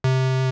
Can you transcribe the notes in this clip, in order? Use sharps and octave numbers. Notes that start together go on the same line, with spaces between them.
C3